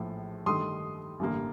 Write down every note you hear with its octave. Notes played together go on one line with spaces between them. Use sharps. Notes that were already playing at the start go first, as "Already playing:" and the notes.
Already playing: A#1 A2 F3
G2 D#3 A3 C6 D#6
A1 G2 D3 G3 A#3